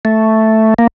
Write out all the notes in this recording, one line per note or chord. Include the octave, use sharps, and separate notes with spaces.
A3
A#3